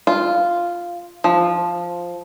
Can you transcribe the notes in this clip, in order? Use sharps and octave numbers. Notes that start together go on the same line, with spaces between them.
F4
F3